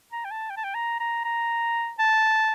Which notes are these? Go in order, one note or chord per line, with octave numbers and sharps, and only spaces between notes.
A#5
G5
A5
G5
A5
G5
A#5
A#5
A#5
A5